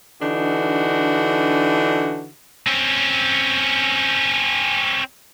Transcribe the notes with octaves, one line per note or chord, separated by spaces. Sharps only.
D3 E3 D4 D#4 F#4
C4 C#4